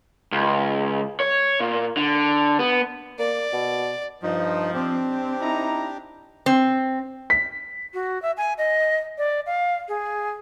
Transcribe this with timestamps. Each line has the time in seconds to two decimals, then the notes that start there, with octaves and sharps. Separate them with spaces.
0.32 C#2
1.20 C#5
1.60 A#2
1.97 D3
2.59 B3
3.19 A#3 D5
3.53 B2
4.23 G2 F3 D#4
4.74 C4 D4 G4
5.42 D#4 E4 A#5
6.46 C4
7.30 B6
7.93 F#4
8.22 E5
8.37 G#5
8.58 D#5
9.18 D5
9.46 F5
9.88 G#4